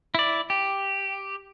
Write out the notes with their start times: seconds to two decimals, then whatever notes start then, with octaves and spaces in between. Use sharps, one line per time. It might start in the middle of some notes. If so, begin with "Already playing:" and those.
0.15 E4 D5
0.50 G4